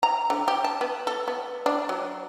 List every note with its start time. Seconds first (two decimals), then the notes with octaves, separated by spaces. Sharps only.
0.03 A#5
0.30 D3
0.48 G4
0.64 A5
0.81 B3
1.07 A4
1.28 B3
1.66 D4
1.89 F#3